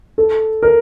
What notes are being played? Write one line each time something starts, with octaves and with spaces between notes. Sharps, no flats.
A4
A#4